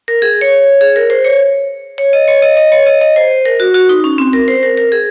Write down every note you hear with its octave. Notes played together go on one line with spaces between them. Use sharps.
A#4
G#4
C#5
G#4
A#4
C5
C#5
C#5
D#5
C#5
D#5
D#5
C#5
D#5
D#5
C5
A#4
F#4
F#4
D#4
C#4
C4
A#4
C5
A#4
A#4
G#4